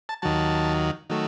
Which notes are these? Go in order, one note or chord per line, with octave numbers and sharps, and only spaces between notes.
A5
D#2 D#3 F#3 A5
D#3 F#3 A3